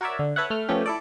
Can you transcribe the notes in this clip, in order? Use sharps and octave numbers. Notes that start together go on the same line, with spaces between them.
F#4 A#4 C#5 D5 E5
D3
A4 B4 C#5 E5 F#5
A3 F6
F3 A3 B3 C#4 G4
E4 A4 D5